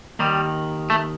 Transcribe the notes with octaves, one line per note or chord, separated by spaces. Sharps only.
D#2 D#3 G3
A3